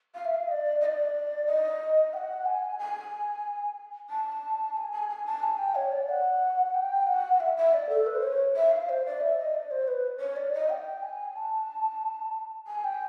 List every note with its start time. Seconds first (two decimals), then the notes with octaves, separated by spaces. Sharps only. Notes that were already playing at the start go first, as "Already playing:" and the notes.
0.15 F5
0.25 E5
0.34 F5
0.48 D#5
0.51 D5
0.81 D#5
0.86 D5
1.47 D#5
2.13 G5
2.17 F#5
2.46 G#5
2.79 G#5
4.10 A5
4.77 G#5
4.92 G#5
5.09 G#5
5.26 A5
5.43 G#5
5.58 G5
5.75 C#5
5.92 D5
6.09 F#5
6.74 G5
7.07 F#5
7.40 E5
7.57 E5
7.74 D5
7.89 A4
8.07 B4
8.15 C5
8.23 C#5
8.56 E5
8.71 F5
8.89 C5
9.05 D5
9.21 E5
9.38 D#5
9.54 D5
9.71 C5
9.88 B4
10.20 C#5
10.36 D5
10.53 D#5
10.69 G5
11.03 G#5
11.36 A5
12.67 G#5
12.84 G5